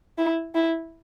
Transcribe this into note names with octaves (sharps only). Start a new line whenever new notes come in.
E4
E4